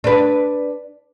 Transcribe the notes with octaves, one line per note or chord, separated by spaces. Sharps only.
D4 B4